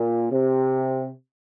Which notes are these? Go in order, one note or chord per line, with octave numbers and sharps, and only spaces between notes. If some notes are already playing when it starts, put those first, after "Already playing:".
Already playing: A#2
C3